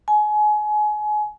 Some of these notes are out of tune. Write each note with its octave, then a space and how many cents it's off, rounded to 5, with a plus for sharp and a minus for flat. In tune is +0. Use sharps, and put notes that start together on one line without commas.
G#5 +30